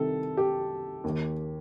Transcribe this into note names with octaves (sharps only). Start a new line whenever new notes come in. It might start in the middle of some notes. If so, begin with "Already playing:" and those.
Already playing: C2 C3 D#3 A4
G4
D#2
D#3